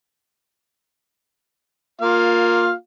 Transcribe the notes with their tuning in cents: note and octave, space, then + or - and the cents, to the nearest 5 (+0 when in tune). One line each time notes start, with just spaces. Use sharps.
A#3 +0 F4 +20 F5 +0